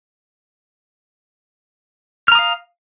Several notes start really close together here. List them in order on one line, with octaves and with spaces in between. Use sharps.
F6 A#5 D#6 F5